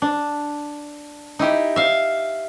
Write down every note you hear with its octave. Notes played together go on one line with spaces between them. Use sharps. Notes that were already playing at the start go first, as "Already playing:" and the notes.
D4
D#4 E4 G4
E5 F5